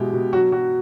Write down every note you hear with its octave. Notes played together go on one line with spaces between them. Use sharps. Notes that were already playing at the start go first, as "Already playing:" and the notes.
Already playing: B2 G#3 E4 G4
B2
F#3 F#4
F#3 F#4